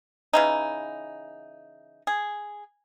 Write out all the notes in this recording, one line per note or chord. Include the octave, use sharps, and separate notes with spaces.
C#3 E3 D#4
G#4